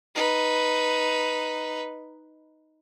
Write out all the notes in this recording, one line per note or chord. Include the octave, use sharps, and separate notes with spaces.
D#4 B4